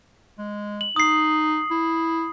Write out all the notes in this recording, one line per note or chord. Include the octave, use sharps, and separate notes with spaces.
G#3
F#7
D#4 D#6 C7
E4